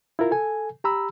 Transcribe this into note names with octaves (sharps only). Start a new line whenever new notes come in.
E4 F4 A#4
A4 G#5
G4 A#5 B5 E6